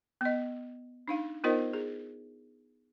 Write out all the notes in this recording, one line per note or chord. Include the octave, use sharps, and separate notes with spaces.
B3 D#5
D4 D#4 F5
B3 D#4 F4 A#4 C5 D#5
G#4